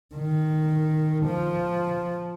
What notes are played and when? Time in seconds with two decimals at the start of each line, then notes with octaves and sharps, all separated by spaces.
0.15 D#3
1.25 F3